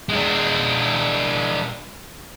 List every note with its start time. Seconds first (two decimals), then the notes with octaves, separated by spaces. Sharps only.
0.09 G#3 D4